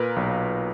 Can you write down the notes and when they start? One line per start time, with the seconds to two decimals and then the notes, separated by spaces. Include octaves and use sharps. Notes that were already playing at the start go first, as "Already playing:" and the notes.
Already playing: A#2 A#4 B4
0.16 B1